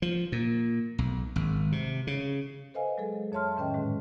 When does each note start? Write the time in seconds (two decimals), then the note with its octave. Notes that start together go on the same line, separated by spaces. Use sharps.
0.02 F3
0.32 A#2
0.98 B1
1.36 G#1
1.72 C3
2.07 C#3
2.74 A4 B4 C5 D#5 F5 G#5
2.98 F#3 G#3 G#4 A4
3.32 F2 C#5 E5 A5 C6 F6
3.57 A2 D#3 C#4 B4 D#5 G5
3.74 G#2 D3 G#3